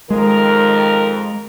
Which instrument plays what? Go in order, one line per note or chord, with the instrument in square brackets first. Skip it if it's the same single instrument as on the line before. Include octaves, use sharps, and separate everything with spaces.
[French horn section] F2 D#3 A#4 [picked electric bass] G#3